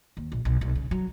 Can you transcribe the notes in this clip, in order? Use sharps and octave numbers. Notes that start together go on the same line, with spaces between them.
D#2
A#1
B1
B1
C#3
F#3